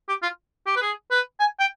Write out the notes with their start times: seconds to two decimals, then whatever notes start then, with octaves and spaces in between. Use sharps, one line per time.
0.09 G4
0.23 F4
0.66 G4
0.76 B4
0.82 G#4
1.11 B4
1.40 G#5
1.60 G5